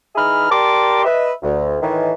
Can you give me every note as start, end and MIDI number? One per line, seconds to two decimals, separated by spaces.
0.16 0.49 52
0.16 0.49 63
0.16 0.49 68
0.16 0.49 76
0.16 0.49 83
0.16 0.49 89
0.50 1.04 67
0.50 1.04 70
0.50 1.04 74
0.50 1.04 81
0.50 1.04 84
0.50 1.04 86
1.05 1.31 71
1.05 1.31 75
1.05 1.31 76
1.43 1.77 38
1.82 2.12 45
1.82 2.12 51
1.82 2.12 52